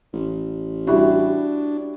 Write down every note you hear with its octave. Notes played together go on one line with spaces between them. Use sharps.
A1
G3 D4 E4 F#4